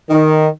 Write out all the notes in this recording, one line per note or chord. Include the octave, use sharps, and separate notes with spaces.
D#3